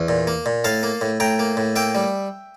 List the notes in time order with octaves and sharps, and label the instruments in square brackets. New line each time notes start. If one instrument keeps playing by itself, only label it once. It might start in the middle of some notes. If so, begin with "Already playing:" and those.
Already playing: [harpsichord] E2
A#2
A#3
A#2
A2 F5 A5
A#3
A2
A2 G5 A#5
A#3
A2
A#3 E5 G5
G3